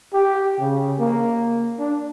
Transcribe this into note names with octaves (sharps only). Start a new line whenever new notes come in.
G4
C#3
A#3
D4